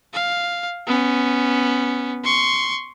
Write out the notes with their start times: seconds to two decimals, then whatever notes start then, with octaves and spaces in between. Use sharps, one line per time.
0.14 F5
0.87 B3 C#4
2.24 C6 C#6